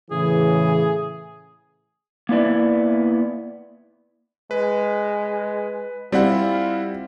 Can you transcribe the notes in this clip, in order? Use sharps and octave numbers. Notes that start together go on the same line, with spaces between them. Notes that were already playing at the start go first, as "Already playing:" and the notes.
A2 C#3 E3 G#4
A#3 B3 E4 D5 E5
G#3 B4
G3 C4 E4 F4 F#5